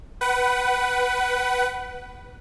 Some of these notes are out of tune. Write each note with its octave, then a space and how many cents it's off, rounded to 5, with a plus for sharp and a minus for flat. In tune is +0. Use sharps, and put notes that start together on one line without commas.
B4 +0 F#5 +30